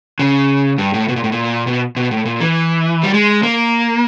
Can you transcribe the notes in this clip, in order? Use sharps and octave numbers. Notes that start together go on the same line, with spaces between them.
C#3
G2
A2
B2
A#2
A2
A#2
B2
B2
A2
A#2
E3
G3
G#3
A#3